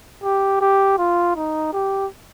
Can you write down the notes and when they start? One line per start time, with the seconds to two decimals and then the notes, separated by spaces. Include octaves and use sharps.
0.23 G4
0.61 G4
0.98 F4
1.36 D#4
1.73 G4